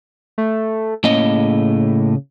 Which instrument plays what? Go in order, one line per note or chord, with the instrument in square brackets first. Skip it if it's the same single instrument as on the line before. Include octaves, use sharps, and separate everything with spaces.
[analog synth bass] A3
[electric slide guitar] A2 A#3 D#5 [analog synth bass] C#3